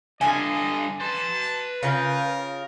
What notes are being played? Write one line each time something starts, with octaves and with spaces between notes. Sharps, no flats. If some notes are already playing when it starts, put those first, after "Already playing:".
G2 D3 D#5 G#5
B4 A5 C6
C#3 F4 A#4 G5